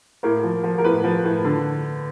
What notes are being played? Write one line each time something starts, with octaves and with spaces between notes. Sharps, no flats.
A2 A#3 A#4
F3
F3
A#4
A2 B3 B4
F3
A2
D3